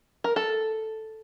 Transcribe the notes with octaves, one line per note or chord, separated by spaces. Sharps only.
A#4
A4